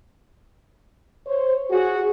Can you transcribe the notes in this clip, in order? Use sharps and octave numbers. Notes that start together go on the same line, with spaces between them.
C5 C#5
F#4 G#4